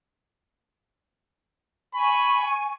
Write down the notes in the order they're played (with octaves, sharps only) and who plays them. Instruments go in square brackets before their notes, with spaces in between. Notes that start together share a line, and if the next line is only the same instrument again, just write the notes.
[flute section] G#5 C#6 [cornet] B5